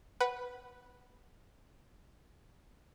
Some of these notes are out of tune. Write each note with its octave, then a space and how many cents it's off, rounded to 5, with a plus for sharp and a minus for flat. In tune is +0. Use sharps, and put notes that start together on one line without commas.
B4 -5 F#5 +10